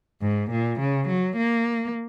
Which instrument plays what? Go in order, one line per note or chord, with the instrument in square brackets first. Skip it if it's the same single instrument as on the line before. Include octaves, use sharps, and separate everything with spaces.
[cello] G#2
A#2
C#3
F#3
A#3